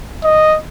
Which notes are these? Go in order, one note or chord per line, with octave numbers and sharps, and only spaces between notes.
D#5